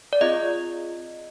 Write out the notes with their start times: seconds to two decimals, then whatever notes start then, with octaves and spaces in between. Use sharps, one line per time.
0.13 D5
0.21 C4 F4 G#4 D#5